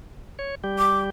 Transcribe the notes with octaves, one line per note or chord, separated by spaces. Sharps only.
C#5
G3 G4
D6